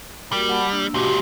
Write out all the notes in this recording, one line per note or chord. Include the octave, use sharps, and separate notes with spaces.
G3 A#3 F#4 A#4
F#5 A5 B5
A#3 D4 E6
C#2 A#2 F#4 G4 A5
G4